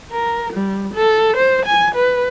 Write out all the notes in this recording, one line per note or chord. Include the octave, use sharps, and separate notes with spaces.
A#4
G3
A4
C5
G#5
B4